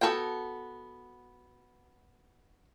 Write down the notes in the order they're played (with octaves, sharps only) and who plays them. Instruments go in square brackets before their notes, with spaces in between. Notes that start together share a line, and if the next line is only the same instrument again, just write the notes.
[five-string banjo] B3 F#4 A4 C5 G5